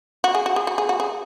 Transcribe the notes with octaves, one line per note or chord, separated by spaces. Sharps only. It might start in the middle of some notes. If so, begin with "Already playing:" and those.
F#4
G#4
F#4
G#4
F#4
G#4
F#4
G#4